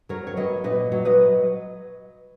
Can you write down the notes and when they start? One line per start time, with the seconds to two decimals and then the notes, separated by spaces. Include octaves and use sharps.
0.09 F#3 A#4 C#5
0.27 C#5
0.37 F#3 B4 D#5
0.64 A#2 B4 D#5
0.92 F#3
1.05 B4 D#5